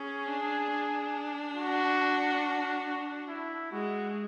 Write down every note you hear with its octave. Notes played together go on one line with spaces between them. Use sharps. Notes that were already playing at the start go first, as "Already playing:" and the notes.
Already playing: C#4 G#4
D4
D4
F#4
E4
G#3 F#4